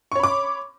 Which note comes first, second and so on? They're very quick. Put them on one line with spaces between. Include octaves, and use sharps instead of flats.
C#6 C#5 B5 D6